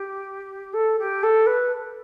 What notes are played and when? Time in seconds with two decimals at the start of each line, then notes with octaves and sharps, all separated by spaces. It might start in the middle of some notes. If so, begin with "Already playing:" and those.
Already playing: G4
0.73 A4
0.98 G4
1.23 A4
1.46 B4